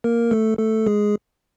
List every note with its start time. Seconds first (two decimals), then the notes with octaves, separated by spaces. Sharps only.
0.04 A#3 A#4
0.31 A3 A4
0.59 A3 A4
0.87 G#3 G#4